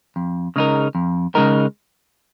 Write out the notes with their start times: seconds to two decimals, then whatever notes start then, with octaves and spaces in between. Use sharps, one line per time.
0.16 F2
0.56 C#3 G#3 D#4 A#4
0.95 F2
1.35 C#3 G#3 D#4 A#4